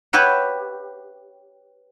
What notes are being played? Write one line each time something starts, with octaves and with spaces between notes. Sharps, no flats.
G4 B4 C#5 E5 F#5